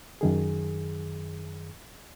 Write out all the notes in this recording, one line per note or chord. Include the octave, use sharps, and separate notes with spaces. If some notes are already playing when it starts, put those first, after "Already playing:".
F#2 D#3 G#4